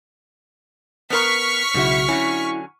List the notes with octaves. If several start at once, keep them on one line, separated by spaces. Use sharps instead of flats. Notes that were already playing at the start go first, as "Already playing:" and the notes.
B3 A#4 C#6 F6 B6
B1 G#2 C#3 E4 F#4
D3 F#3 C#4 E4